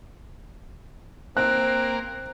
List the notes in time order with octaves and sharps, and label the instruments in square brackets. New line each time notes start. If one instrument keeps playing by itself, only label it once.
[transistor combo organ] A#3 [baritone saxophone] C4 [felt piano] F#6